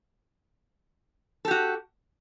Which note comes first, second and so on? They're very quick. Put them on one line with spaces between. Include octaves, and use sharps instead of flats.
A4 G4 F#4